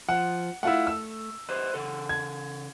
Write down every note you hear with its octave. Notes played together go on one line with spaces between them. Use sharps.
F3 F#5
A3 E4 F4 F#5
E6
B4 C5 D#5
C#3 A4
G#6